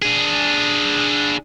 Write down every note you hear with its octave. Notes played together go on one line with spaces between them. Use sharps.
D4 G#4